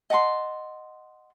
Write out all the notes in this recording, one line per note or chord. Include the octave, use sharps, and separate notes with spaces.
D#5 F#5 A5 C6